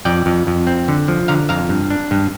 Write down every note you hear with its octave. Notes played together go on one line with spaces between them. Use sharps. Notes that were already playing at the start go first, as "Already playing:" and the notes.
F2 D5 G5
F2
F2
C4
D3
F3
D3 F5 A#5
F2 F5 A#5
G2
D4
G2